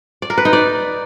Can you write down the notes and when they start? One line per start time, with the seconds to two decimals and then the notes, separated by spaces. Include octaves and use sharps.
0.22 D5
0.30 A#4
0.38 B4
0.45 D#4
0.53 D5